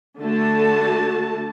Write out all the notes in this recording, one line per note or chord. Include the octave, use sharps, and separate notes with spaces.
D3 A3 F#4 A5